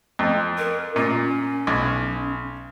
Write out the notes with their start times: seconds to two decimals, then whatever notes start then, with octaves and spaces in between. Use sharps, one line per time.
0.19 F2
0.58 A#4
0.96 A#2 C#4
1.67 B1